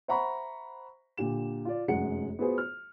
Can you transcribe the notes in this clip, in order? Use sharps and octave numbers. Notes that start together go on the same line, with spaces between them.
C5 E5 F#5 A#5 B5 C#6
A#2 D3 G4 E7
F4 D5
F1 F#2 G#3 F#5 C#7
B3 F4 F#4 G#4 B4 C5
F6